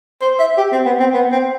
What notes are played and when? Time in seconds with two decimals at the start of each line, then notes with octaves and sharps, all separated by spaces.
0.21 C5
0.39 E5
0.58 G4
0.72 C4
0.85 B3
1.00 C4
1.14 B3
1.32 C4